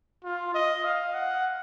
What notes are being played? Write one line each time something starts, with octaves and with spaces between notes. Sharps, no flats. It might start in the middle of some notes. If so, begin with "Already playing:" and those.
F4
D#5
F5
F#5